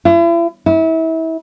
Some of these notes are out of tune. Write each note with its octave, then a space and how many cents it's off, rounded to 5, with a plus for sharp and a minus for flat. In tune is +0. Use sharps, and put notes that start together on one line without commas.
E4 +40
E4 -30